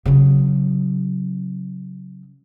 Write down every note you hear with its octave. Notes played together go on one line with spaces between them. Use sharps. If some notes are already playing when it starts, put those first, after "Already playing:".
C#3 F#3